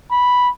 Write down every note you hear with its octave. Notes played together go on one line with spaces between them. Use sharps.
B5